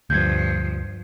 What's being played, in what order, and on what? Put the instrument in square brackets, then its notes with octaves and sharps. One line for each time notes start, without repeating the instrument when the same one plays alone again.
[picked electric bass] D2 [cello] G2 F3 [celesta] G6 G#6